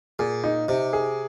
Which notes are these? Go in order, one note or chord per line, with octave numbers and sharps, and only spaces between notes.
A#2 G#4
D#4
C3 D#4
G#4